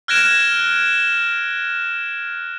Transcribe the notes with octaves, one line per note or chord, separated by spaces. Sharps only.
F6 F#6 G#6 A#6 D7 E7